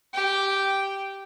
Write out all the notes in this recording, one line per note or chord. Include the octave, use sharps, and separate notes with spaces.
G4 G5